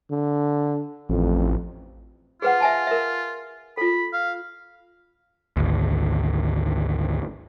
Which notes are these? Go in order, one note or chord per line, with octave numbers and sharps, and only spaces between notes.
D3
A1 F2
F4 G#4 B4 F#5
E5 G#5 A5
A#4 E5
F4 A4 B5
F5
G#1 D2